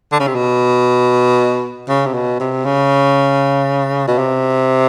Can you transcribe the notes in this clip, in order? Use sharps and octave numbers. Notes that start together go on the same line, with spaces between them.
D3
C#3
C3
B2
C#3
C3
B2
C3
C#3
B2
C3